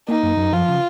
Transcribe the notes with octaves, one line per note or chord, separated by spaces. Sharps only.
A#3 D#4
F#2
F#2
F3 F4
C#3